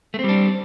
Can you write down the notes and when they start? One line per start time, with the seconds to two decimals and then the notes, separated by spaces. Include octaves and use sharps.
0.14 A3
0.19 C4
0.24 G3
0.29 D4